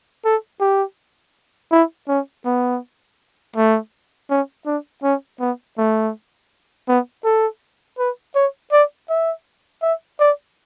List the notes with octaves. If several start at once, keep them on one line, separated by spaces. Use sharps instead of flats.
A4
G4
E4
C#4
B3
A3
C#4
D4
C#4
B3
A3
B3
A4
B4
C#5
D5
E5
E5
D5